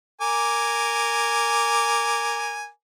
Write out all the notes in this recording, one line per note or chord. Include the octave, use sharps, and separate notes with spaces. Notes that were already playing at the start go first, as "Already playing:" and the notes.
A#4 G#5 D6